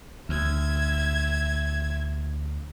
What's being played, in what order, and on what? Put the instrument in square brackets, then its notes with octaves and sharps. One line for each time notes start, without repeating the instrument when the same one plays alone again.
[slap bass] D2 [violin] E5 G#6